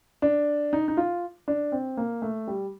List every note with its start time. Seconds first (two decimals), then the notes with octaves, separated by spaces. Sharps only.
0.22 D4
0.73 D#4
0.88 D#4
0.97 F4
1.48 D4
1.72 C4
1.97 A#3
2.22 A3
2.47 G3